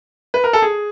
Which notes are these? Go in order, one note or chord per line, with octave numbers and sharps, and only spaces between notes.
B4
A#4
A4
G#4